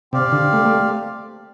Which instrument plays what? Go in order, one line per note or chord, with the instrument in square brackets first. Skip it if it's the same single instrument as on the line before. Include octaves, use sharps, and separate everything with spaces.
[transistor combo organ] C3 [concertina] C4 G4 D5 F5
[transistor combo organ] D3
A3
A3